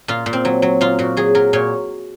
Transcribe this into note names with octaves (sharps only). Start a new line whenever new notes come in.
A#2 F4
A#2
C4
F#3
F#3
A#2 F4
A#2 F#4
F#3 G#4
F#3 A#4
A#2 C#5